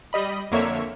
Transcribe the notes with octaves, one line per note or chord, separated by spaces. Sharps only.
G3 D#5 B5
F2 D3 A#3 C#5 E5